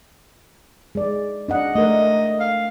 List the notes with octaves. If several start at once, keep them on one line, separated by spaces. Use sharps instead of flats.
G#3 D5
D4 D#5 F#5
A3 A#4 D#5
F5